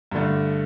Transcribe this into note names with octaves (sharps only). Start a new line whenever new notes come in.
G2 D3 A3